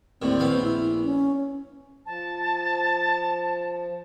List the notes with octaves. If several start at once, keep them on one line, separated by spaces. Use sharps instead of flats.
D#2 A2 D3 C4
A#1 B3 F5
E4
C#4
F3 A5